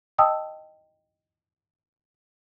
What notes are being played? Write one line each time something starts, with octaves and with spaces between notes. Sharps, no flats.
D#5 G5 A5 D#6 E6